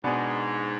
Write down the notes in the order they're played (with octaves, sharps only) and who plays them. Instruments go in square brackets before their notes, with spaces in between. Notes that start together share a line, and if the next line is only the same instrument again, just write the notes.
[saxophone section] G#2 [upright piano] B2 B3 D4 G#4